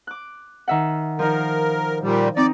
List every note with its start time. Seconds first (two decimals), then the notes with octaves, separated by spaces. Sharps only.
0.07 D6 F#6
0.68 D#3 E5 F#5
1.19 D#3 F3 A#4
2.02 A#2 G3
2.36 C4 D#4 D5